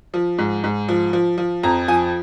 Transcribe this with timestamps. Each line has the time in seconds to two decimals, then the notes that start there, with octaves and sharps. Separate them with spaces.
0.14 F3
0.38 G#2
0.64 G#2
0.89 F3
1.13 F3
1.38 F3
1.63 F2 A#5
1.88 F3 G#5